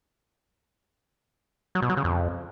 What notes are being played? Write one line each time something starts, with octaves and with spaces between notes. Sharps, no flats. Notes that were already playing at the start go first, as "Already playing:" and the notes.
F#3
B2
F#3
C#3
F2